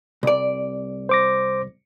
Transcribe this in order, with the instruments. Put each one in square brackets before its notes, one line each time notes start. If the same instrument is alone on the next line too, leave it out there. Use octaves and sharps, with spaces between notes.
[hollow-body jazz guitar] C2 D5
[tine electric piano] C5 D6 A#6